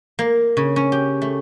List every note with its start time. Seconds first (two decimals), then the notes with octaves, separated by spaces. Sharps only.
0.19 A#3
0.57 C#3
0.76 C#4
0.92 G4
1.22 A3